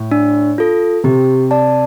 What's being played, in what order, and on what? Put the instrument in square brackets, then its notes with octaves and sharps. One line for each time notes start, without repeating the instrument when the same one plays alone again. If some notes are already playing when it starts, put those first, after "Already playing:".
Already playing: [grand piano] A2
[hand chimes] D4
F4 A4
[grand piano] C3 [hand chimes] G4
[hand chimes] D5 A5